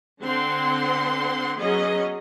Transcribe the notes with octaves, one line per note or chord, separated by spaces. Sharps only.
D3 C4 F#5 C6
F#3 B3 C#4 G#4 D#5